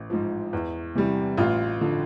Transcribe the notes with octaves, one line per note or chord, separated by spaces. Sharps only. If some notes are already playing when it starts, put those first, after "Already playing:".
Already playing: A1
G#2 F3
E2
C3 E3 G3
A1 F4
D3 F3